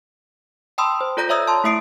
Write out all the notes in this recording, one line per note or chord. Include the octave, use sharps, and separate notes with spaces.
G5 A5 B5 C6 D#6 E6
C5
F4 A4 D5 A#5 G6 A#6
C#5 E5 A#5 D#6 E6 G#6
A5 C6
A3 E4 E5 D#6 C7 D7